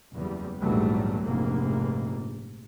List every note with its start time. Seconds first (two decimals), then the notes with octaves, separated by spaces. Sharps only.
0.15 F#1 E2 G3
0.60 A#1 E2 G#2 F#3 G3 A3
1.25 F1 A#1 G#2 A3 A#3